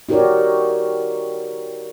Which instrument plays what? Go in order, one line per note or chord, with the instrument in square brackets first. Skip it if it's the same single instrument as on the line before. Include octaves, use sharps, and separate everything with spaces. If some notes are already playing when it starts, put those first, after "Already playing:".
[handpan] D#4 F#4 G4 A#4 C#5 D5